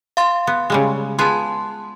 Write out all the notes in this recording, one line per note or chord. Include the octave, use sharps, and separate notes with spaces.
F5 C6 A6
B3
C#3 G3 G#3
B3 F4 G#4 A5 C6